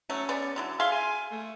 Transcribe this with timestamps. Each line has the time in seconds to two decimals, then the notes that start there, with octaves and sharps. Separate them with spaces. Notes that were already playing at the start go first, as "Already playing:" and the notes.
0.10 F#3 A3 C#4
0.29 B3 G#4 D5
0.56 D3 F#3 E4
0.80 G#4 E5 F5 C6
0.92 G#5
1.31 A3